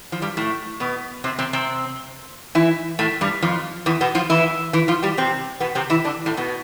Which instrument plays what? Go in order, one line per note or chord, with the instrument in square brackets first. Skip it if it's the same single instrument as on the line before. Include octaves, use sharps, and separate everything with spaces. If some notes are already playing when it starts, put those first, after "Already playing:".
[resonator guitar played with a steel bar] F3
G2 G3
A2 A3
B2 B3
C3 C4
C3 C4
C3 C4
E3 E4
A2 A3
G2 G3
F2 F3
E2 E3
B2 B3
F3 F4
E3 E4
E3 E4
F3 F4
G3 G4
C3 C4
B2 B3
C3 C4
E3 E4
D3 D4
A2 A3
B2 B3